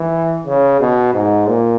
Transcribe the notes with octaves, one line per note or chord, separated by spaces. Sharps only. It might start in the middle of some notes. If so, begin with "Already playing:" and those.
Already playing: E3
C#3
B2
G#2
A#2